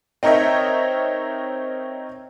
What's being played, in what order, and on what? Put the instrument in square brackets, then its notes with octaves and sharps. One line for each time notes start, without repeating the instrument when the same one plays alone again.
[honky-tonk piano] C4 D#4 A#4 C#5 D#5 E5